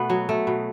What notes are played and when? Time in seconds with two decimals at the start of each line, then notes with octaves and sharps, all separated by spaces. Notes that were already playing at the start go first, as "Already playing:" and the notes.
Already playing: B2 A3 B3
0.10 F#3
0.29 A3
0.47 B2